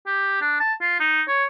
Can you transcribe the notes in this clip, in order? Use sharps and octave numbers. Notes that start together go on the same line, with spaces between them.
G4
D4
A5
F4
D#4
C#5